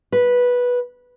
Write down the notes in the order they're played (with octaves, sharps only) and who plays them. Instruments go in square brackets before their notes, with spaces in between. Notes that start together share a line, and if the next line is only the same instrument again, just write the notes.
[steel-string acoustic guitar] B4